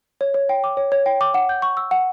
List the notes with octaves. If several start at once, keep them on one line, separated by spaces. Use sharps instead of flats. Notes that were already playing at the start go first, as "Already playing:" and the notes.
C#5
C#5
G5
D6
C#5
C#5
G5
D6
F#5
G6
C#6
E6
F#5